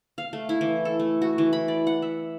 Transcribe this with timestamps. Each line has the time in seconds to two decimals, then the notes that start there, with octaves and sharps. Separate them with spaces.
0.18 F5
0.33 A3
0.49 E4
0.61 E3
0.85 A4
0.99 A3
1.22 F#4
1.38 E3
1.53 B5
1.68 D5
1.87 F#5
2.02 E5